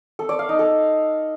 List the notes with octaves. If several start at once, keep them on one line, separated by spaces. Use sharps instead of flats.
A4
D5
F5
D#4
A4